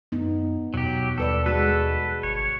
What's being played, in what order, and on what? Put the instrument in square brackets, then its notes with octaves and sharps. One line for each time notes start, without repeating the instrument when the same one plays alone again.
[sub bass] F#2 [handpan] B3 D#4
[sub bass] E2 [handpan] B2 [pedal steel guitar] F#3 G4
[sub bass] D#2 [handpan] G3 B4 D5 [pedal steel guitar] A4
[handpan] G#3 F#4 [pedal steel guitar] A4 B4
[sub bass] G1 [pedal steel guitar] C#5